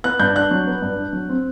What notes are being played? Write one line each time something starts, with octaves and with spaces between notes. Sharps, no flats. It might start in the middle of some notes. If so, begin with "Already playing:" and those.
B3 F#6
G2 G6
D4 F#6
F#3
B3
G2
D4
F#3
C4